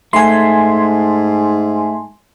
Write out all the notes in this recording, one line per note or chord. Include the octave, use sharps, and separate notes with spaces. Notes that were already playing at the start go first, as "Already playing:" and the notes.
G#2 A3 G#5 C6